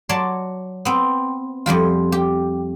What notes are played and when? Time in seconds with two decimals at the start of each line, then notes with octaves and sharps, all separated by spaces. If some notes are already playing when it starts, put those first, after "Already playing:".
0.09 F#3 C#5 D5 A5 C6
0.85 B3 C4
1.66 F2 F3 G3 F4
2.12 G4